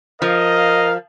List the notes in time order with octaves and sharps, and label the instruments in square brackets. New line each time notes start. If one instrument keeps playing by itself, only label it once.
[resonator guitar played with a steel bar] F3 [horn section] A#4 F5 [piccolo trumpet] D#5